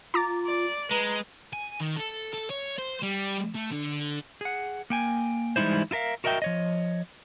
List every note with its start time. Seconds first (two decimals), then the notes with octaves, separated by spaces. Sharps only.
0.14 F4 A#5 D6 A6
0.47 D5
0.91 G#3 B4 A#5
1.53 G#5
1.80 D#3
1.96 A4
2.33 A4
2.50 C#5
2.78 C5
3.02 G3
3.55 A3
3.71 D3
4.41 G#4 F#5
4.90 A#3 G5 G#5
5.56 E3 G3 G#3 D#4 E4 C5
5.91 E4 F4 A#4 E5 F5
6.24 F#4 A#4 D#5 E5 G5
6.42 F3 C#5 D#5